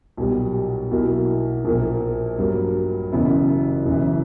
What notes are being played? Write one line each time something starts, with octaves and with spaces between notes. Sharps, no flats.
B1 A#2 G3 B3
B1 B2 A#3 E4
A#1 A#2 A#3
G2 F#3 A#3
F#1 F#2 E3 B3 E4
F#1 F#2 E3